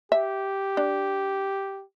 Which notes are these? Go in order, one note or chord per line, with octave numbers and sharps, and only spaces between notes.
G4 E5
D4